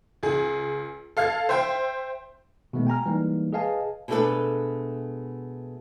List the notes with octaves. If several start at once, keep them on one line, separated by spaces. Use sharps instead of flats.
C#2 G#4
A4 F5 F6 G#6
C5 E5 G5
B2 D#3 G#3 A3 B3
G5 G#5 A#5 F6
E3 G3 G#3 A#3 D#4
G#4 B4 D#5 F5 G#5 A5
B2 G#3 A3 D4 A4 B4